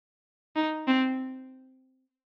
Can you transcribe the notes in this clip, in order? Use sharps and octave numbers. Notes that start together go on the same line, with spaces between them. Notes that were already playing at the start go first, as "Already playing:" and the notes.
D#4
C4